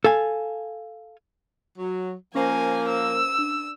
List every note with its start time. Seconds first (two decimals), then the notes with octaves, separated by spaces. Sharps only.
0.04 A4 F5 G#5
1.78 F#3
2.35 F3 A#3 C#4 A#4 C5 G#5
2.89 E6
3.39 D4